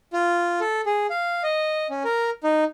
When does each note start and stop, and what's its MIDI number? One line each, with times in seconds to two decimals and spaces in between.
0.13 0.60 65
0.60 0.81 69
0.86 1.07 68
1.10 1.43 77
1.43 1.87 75
1.90 2.03 61
2.04 2.30 70
2.44 2.64 63